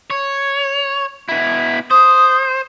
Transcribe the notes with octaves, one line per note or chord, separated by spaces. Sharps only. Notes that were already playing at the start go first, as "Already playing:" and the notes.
C#5
B2 E4
C5 D#6